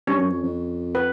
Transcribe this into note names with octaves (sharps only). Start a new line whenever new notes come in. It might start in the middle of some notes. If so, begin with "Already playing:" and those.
G2 C#4 C#5
F#2
F2
F2
B4